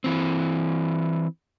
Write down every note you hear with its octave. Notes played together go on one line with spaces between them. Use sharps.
E3 C4